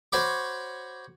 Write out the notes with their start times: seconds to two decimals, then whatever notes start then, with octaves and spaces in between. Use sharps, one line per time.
0.12 F#4 C5 C#5 B5 C#6 D6